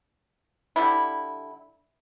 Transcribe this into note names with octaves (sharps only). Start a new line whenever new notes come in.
D3 G3 E4